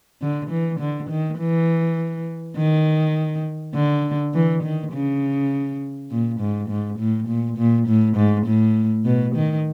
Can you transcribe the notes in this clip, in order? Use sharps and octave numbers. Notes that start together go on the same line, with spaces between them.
D3
E3
D3
D#3
E3
D#3
D3
E3
D#3
C#3
A#2
G#2
G#2
A2
A#2
A#2
A2
G#2
A2
B2
D#3